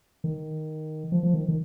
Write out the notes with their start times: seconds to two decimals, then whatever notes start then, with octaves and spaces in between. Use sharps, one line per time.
0.24 D#3
1.12 F3
1.23 F3
1.34 D#3
1.48 D#3